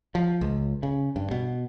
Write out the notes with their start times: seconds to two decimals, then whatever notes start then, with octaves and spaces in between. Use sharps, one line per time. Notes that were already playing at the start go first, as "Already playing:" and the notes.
0.15 F3
0.41 C#2
0.83 C#3
1.16 G2
1.31 B2